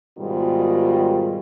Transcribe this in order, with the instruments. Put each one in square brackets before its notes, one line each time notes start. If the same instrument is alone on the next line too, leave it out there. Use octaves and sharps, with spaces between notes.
[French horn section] G#2 B2 D#3 G3 F4